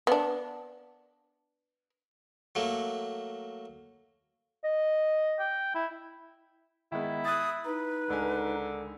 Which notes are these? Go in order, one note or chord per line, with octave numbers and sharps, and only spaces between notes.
B3 D4
F#3 A3 A#3
D#5
G5
E4
D#3 G#3 B3 E4
D#6 F#6 A6
D#4 B4
C#2 D3 A#4 G#5